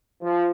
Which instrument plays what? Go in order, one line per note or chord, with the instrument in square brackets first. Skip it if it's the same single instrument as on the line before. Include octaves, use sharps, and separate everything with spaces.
[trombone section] F3